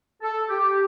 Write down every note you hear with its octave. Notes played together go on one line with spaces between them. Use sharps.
A4
G4